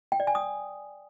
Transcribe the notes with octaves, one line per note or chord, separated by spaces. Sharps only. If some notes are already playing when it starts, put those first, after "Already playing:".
G5
D5
G#5
D#6